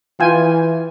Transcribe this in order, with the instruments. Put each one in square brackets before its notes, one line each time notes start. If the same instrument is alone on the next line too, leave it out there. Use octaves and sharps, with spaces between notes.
[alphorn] E3 [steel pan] F4 G5 G#5